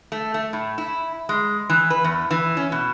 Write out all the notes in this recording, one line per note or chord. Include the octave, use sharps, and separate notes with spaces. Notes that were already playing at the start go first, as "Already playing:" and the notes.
A3
A3
A2
E4
G#3
E3
B4
E2
E3
C#4
B2